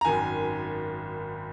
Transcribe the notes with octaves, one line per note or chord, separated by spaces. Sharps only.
A#5
G#1 F#2 D#3 G#5